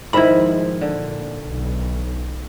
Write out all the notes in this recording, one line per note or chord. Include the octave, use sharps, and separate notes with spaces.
G#2 D#3 F3 G#3 E4 E5 B5
A#2 D3
B1